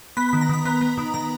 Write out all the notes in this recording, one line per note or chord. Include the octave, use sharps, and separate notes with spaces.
B3 B5
B5
D#3
A#5
D#3 B5
B3 B5
B3
D#3
D#3 A#5